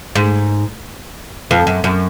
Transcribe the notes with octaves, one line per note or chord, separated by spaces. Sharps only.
G#2
F2
F#2
F#2